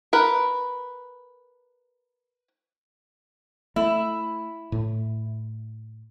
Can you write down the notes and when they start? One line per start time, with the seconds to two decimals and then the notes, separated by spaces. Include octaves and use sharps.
0.13 A#4 B4
3.76 A3 E4
4.72 A2